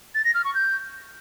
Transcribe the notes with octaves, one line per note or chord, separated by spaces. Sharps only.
A6
A#6
F6
C#6
G6